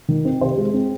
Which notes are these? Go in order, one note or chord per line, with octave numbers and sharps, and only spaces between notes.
D#3
C4
C3 C5
G#3
C4